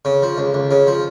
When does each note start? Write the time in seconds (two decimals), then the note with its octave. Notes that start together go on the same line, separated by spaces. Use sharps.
0.05 C#3
0.22 F3
0.38 C#2
0.54 C#2
0.71 C#3
0.87 F3